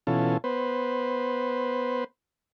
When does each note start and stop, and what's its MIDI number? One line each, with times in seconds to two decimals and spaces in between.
0.07 0.37 47
0.07 0.37 52
0.07 0.37 61
0.07 0.37 65
0.07 0.37 69
0.44 2.04 59
0.44 2.04 71
0.44 2.04 72